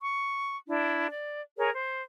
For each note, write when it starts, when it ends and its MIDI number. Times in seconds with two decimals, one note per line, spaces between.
0.01 0.56 85
0.68 1.07 62
0.68 1.07 64
1.10 1.42 74
1.58 1.69 68
1.58 1.69 70
1.58 1.69 73
1.58 1.69 82
1.73 2.03 72